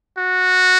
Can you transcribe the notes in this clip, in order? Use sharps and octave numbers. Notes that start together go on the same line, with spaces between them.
F#4